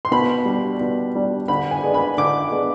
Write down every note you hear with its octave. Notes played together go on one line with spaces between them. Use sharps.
C6
B2 B5
G3 D4
B2
G3 D4
D3 B5
G#5
G#3 B3 D4
B5
D3 D6
G#3 B3 D4